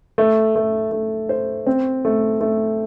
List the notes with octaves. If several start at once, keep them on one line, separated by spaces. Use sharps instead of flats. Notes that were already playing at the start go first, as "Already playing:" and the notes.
A3
A3
A3
C5
C4
A3
A3